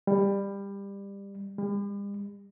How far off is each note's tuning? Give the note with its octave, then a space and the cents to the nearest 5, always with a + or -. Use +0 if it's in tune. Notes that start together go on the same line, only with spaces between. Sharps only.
G3 +20
G3 +45